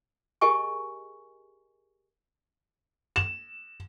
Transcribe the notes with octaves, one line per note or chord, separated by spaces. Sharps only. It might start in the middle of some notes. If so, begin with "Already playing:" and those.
G4 G#4 A#4 D#5 G#5 C#6
E7